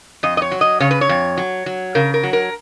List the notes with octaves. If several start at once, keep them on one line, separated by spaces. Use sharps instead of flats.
F2 D#5
D#5
C#5
F#3
D#5
C#3 C#5
B4
C#5
F2
F#3
F#3
C#3 A#4
A#4
F#3
A#4